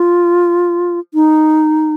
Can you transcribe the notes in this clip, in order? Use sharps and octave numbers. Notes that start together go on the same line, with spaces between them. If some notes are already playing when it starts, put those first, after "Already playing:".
Already playing: F4
D#4